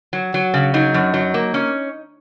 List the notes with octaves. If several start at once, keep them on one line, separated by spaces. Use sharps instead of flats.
F#3
F#3
C#3
F#3 D#4
F#2
F#3
A#3
C#4